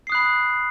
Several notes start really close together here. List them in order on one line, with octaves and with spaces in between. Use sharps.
C7 D#6 F#6 B5